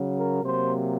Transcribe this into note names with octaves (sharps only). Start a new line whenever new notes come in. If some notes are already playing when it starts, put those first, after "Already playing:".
Already playing: C#3 F#3
A#4
C3 F#3 A#3 C5